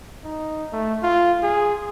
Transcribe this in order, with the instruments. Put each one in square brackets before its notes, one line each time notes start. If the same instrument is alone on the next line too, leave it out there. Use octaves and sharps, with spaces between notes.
[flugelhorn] D#4
A3
F4
G#4